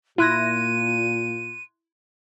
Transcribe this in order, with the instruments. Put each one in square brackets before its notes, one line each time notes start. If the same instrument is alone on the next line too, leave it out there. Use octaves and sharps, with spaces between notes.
[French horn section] A#2 F4 [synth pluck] E4 A#6 [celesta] C6 F#6 G#6 [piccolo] D#7